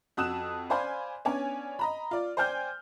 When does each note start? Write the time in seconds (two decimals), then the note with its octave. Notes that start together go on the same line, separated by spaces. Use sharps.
0.17 F2 F#4 D#6 E6 F#6 E7
0.70 C5 D5 F5 G#5 B5 C6
1.25 B3 C#4 D4 C#5 D5 G#5
1.79 D#5 A#5 B5
2.11 F4 D5
2.37 C5 D5 G5 G#5 F6 G6